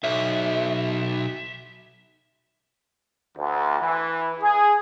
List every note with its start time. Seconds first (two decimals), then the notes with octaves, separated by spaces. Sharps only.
0.04 B1 E5
3.37 D2
3.80 E3
4.41 G#4